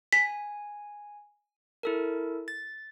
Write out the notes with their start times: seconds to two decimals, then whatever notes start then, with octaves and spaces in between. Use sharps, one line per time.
0.13 G#5 B6
1.83 E4 A4 A#4
2.48 A6